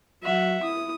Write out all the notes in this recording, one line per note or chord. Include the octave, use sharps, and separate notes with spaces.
F#3 E5 F#5
E4 D#6